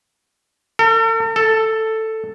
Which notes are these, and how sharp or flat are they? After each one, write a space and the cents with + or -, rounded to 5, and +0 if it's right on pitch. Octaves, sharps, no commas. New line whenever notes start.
A4 +45
A4 +5